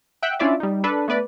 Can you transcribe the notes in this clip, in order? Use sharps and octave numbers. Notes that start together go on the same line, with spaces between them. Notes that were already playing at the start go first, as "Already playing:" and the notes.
E5 F#5 G5 E6 F#6
C#4 D4 E4 F4 D5 E5
G3 D#4
D4 A4 B4
A3 B3 B4 D5